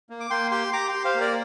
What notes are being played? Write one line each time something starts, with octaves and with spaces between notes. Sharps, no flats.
A#3
D6
A#3 G5 C6
G4 G5 C6
G4 A#5 D6
G5 C6
G4
C5 F5
A#3
A#4 D5